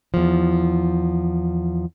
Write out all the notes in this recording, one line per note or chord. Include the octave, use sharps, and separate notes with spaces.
E2 F3